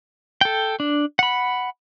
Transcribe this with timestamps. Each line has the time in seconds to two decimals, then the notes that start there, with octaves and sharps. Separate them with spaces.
0.41 A4 G5
0.80 D4
1.19 F#5 B5